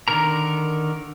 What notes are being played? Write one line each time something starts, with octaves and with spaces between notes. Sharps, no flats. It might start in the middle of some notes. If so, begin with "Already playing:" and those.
D3 D#3 A#4 A#5